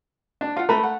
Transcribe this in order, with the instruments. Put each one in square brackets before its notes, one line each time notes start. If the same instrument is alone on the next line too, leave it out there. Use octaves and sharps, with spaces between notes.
[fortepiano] D4
[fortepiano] F4 [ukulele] F5 F#5
[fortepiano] A3 A#5 [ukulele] B4 B5
[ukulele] F#5